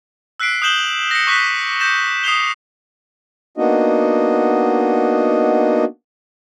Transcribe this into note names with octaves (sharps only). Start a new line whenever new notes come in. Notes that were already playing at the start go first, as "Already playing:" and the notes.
E6 F#6 B6 C7 D7
D#6 F#6 G6 E7 F#7 G7
A#6 C#7
C#6 D6 F#6 B6 E7
G6 A#6 C#7 E7
D#6 G6 C7 E7 F7 G7
A#3 B3 D4 D#4 F#4 D#5